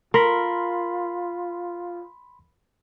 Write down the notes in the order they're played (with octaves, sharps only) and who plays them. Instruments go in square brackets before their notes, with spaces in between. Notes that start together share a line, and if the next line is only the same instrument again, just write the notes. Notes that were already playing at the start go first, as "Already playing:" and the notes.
[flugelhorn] F4 [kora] A#4 [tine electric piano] B5 C6